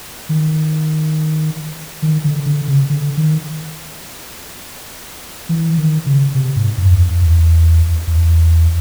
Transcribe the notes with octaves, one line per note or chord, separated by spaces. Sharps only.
D#3
D#3
D3
D3
C#3
D3
D#3
E3
D#3
C#3
C3
G#2
F#2
E2
F2
E2
E2